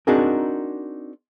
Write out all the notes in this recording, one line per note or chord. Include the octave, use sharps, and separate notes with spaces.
C4 D4 D#4 F#4 G#4 A#4